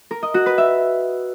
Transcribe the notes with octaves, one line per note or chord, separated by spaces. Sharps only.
A#4
D#5
F#4
B4
E5